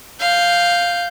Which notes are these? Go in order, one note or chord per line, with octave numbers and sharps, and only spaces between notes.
F5 G6